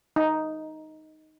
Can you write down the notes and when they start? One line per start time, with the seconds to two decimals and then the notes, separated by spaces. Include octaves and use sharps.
0.16 D#4